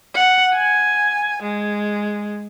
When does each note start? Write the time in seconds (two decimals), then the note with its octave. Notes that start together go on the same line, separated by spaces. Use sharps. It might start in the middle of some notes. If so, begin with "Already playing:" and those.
0.15 F#5
0.54 G#5
1.43 G#3